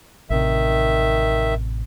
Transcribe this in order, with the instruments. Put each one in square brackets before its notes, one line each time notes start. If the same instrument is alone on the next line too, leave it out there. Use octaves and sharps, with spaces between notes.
[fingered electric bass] A1 C3 [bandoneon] D#3 E5